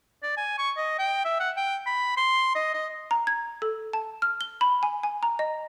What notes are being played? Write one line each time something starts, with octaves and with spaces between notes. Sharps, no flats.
D5
G#5
C#6
D#5
G5
E5
F#5
G5
B5
C6
D#5
D#5
A#5
G#6
A4
A5
F6
G7
B5
G#5
G#5
A#5
D#5